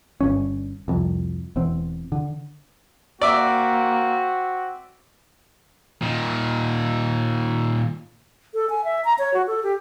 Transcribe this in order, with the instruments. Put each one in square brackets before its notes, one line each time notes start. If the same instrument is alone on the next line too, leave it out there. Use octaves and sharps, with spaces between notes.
[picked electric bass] G1 G2 C#4
C2 F2
E1 E2 C4
D3
[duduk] A#3 [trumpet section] C4 F#4 [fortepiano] D5 E5
[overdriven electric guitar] A#2 D#3
[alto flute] A4
G#5
E5
A#5
C#5
F#4
A4
G4